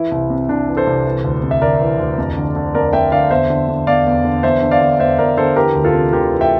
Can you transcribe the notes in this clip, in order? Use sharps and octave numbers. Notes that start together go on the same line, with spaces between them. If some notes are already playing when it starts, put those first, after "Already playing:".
Already playing: E3 E4
C2
C3
C2 D4
E3
A4 C5
C2
E3
D2
C3
E5
D2 A#4 D5
E3
D2
F2
D3
D3
F2 A#4 D5
F2 E5 G5
D3 D5 F5
E2 C5 E5
D3
D3
E2 D5 F5
E2
D3
E2 C5 E5
D3
D5 F5
D3
E2 C5 E5
E2 A#4 D5
D3 A4 C5
E3 G4 A#4
D2
F4 A4
C3
D2 G4 A#4
E3
E5 G5